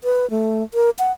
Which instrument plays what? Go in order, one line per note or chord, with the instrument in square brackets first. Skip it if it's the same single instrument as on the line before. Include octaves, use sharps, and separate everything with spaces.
[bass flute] B4
A3
A#4
F#5